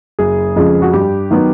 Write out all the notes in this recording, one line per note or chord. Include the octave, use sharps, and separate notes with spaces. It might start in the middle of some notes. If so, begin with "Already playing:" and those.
F#1 G#4
F2 C#3 F3 G#3
F#4
G2 G4
D#3 F#3 B3